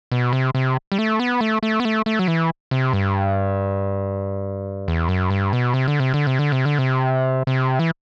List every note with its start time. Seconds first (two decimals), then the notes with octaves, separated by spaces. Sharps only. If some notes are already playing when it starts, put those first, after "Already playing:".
0.12 B2
0.33 C3
0.55 C3
0.92 G3
0.99 A3
1.20 B3
1.41 A3
1.63 A3
1.80 B3
1.85 A3
2.06 A3
2.19 F#3
2.28 E3
2.71 C3
2.93 G2
4.88 E2
5.08 F#2
5.30 G2
5.53 B2
5.74 C3
5.88 D3
6.00 C3
6.14 D3
6.27 C3
6.39 D3
6.52 C3
6.65 D3
6.78 C3
7.47 C3
7.79 E3